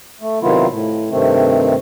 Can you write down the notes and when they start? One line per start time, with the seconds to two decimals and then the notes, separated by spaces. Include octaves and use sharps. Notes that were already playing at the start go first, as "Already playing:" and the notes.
0.21 A3
0.42 C3 D#3 F#3 B3 E4 F4
0.69 A2
1.10 G2 C3 D#3 A3 C4